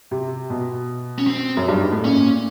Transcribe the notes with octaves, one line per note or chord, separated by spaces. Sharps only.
C3
B2
C#4
C4
F#2
G2
G#2
A2
A#2 C#4